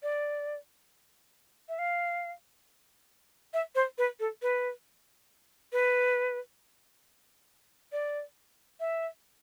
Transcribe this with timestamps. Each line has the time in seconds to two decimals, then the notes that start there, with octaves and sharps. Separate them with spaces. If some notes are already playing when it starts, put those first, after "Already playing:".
0.03 D5
1.69 E5
1.79 F5
3.54 E5
3.75 C5
3.98 B4
4.20 A4
4.42 B4
5.73 B4
7.92 D5
8.80 E5